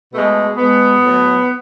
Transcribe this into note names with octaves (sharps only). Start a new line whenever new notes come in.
B2 G#3 A3
B2 G#3 B3
A2 F#3